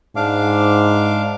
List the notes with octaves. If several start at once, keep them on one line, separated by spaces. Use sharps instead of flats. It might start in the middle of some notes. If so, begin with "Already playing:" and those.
G#2 D4 F5 D6